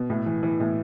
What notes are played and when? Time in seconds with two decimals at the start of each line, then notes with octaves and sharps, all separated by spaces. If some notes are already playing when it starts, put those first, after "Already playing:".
Already playing: B2
0.10 A2
0.26 E3
0.43 E3
0.60 A2